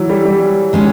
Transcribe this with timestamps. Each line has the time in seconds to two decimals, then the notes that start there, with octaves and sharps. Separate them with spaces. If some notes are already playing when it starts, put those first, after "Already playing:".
Already playing: E3 F#3
0.09 G3
0.25 G3
0.73 D#3 G#3 C#4